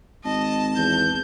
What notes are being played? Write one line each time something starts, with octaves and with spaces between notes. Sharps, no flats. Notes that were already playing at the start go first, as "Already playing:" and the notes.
G#1 D#5 A5
E2 G6